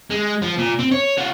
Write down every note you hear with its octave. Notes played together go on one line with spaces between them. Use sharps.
G#3
F3
A#2
C4
C#5
F4 F#4